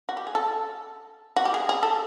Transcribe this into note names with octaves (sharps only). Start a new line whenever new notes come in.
F#4
G4
G#4
A4
F#4
G4
G#4
G#4
A4